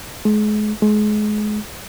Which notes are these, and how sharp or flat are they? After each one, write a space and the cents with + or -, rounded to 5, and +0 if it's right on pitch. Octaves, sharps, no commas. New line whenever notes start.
G#3 +35
G#3 +30